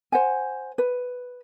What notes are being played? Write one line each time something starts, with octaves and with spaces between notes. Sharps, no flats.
C5 F#5 G#5
B4